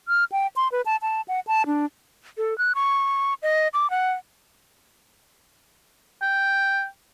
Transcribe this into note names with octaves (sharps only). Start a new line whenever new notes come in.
F6
G5
C6
B4
A5
A5
F#5
A5
D4
A4
F#6
C#6
D#5
D6
F#5
G5